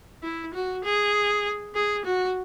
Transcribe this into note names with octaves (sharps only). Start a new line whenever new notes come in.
E4
F#4
G#4
G#4
F#4